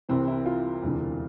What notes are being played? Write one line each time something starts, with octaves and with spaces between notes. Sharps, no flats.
C2 C3 E3 C4
E4
F4
E1 D2 C3 E3